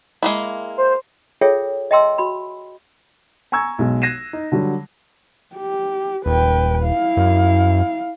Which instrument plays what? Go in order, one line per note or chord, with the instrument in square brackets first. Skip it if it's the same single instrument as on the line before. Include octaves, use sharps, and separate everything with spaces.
[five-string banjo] G#3 A#3 E4
[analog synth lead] C5
[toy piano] F4 G#4 A4 C#5 E5 G5
D#5 E5 G5 A5 C6 E6
F#4 B5
[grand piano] G#5 A#5 C#6 E6 G#6
B1 G#3
F#6 G#6 A#6 C7 D#7 E7
D#4
D3 F#3 G3
[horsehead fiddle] G4
[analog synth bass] D#1 [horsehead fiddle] B4 G5
[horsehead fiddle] E4 F5
[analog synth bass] F#2